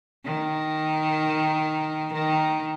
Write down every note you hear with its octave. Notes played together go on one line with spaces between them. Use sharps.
D#3
D#3